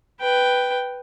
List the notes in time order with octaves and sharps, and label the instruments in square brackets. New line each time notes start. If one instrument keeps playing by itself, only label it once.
[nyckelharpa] B4 G5